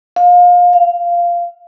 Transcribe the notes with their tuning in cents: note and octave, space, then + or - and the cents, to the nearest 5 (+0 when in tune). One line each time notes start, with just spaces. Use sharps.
F5 +30
F5 -10